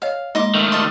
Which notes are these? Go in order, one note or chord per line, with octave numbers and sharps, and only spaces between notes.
C#5 D#5 F5
G#3 A#3 D#4 D#5 C6 D6
D#3 A3
A4 D#5 C6